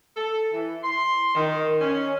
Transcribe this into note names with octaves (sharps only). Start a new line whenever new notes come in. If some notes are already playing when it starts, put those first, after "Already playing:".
A4
E3
C6
D#3
C#4